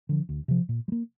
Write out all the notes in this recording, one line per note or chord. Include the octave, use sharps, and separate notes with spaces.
D3 F3
D2
C3 F3
A#2
G3
A#3